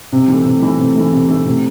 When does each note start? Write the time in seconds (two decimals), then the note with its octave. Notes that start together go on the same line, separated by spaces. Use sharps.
0.12 C3
0.28 E3 A3
0.46 C3
0.62 E3 A3
0.79 C3
0.96 E3 A3
1.12 C3
1.28 E3 A3
1.46 C3